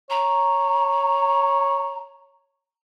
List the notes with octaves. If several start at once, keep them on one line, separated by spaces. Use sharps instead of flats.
C#5 A#5